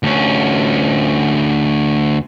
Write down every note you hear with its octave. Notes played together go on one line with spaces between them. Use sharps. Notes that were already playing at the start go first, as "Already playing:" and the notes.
D2 C#4